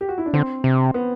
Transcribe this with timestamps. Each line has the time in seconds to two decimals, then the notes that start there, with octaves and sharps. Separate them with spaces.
0.01 G4
0.09 F#4
0.18 E4
0.26 D4
0.34 D3 C4
0.64 C3
0.94 B3